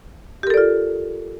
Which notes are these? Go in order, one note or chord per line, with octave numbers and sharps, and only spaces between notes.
F4 G4 A4 A#4 D5